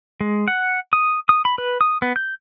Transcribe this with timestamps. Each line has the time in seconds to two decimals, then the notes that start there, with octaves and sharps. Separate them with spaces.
0.21 G#3
0.48 F#5
0.93 D#6
1.29 D#6
1.45 B5
1.58 B4
1.81 D#6
2.02 B3
2.16 G6